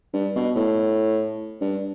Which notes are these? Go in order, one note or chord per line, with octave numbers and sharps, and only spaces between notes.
G2
B2
A2
G2